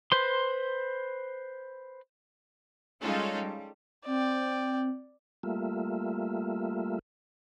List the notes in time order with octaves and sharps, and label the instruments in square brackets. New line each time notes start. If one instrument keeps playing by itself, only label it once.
[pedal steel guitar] B4 C5 C6
[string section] G3 G#3 C#4 D#4 F4 A4
G3
[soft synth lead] C4 [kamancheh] D5 G5
[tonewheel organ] G3 A3 A#3 F4 E5